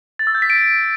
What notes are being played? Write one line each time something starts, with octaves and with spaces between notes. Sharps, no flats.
A6
E6
G6
B6
D7